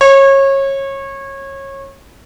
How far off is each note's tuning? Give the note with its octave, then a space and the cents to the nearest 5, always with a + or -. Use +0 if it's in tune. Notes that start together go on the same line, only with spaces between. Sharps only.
C#5 -25